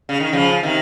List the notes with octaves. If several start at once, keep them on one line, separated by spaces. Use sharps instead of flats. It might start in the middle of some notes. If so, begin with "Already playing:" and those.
C#3
D#3
C#3 F3
C3 D#3